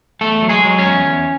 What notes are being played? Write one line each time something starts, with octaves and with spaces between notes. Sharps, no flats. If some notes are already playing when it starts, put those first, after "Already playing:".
E2 A3 A4
F#3
G#3 G#4
F#3
C#4 C#5
E2
E2